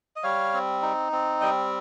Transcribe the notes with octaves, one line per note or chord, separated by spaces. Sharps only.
D#5
G3 C#5 F5
C4
D#4
C4
G3 D#5 G5